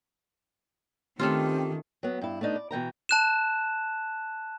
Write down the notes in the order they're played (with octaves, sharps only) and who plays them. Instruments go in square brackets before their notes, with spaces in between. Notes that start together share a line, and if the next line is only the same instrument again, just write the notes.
[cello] D#3 [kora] A3 C#4 F4 [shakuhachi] C4 [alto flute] G4
[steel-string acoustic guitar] F#3 B3
G2 E4
A3 B3 D4 D#4
D5
B2 E3 G5 A#5
[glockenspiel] A5 F#6 E7